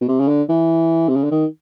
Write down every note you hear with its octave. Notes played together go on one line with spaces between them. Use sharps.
B2
C3
C#3
D3
E3
C3
C#3
D3
D#3